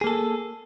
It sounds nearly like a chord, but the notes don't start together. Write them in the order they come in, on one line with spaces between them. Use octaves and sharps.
G#4 A#3 A4